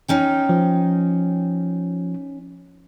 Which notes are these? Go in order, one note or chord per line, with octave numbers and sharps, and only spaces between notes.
C#4 D#4 G5
F3